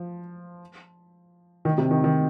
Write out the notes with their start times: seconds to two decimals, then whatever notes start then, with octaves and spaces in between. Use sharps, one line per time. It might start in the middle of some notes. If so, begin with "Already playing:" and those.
Already playing: F3
1.65 D#3
1.78 C3
1.91 D#3
2.04 D#3